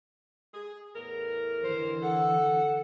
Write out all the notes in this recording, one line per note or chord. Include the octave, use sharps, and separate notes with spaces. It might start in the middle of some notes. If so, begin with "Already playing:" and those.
G#4
E2 A2 A#4
D3 E3 C5
A4 F#5